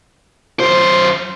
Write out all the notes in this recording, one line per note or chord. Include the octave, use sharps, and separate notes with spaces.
F#2 C5